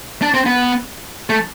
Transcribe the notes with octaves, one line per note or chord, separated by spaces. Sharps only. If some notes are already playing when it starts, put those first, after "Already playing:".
D4
C4
B3
A3